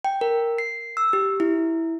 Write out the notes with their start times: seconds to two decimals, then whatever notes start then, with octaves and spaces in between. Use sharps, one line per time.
0.05 G5
0.21 A#4
0.58 C7
0.97 E6
1.13 G4
1.40 E4